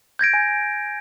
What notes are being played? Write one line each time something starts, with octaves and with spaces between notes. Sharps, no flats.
G6 G#6 A#6 D7
G#5